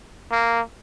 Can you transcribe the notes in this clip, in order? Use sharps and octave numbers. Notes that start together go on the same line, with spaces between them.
A#3